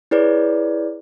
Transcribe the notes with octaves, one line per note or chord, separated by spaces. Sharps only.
E4 G#4 B4 C#5 D5